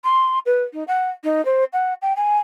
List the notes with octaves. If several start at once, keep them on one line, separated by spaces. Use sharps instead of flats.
C6
B4
D#4
F#5
D#4
C5
F#5
G5
G#5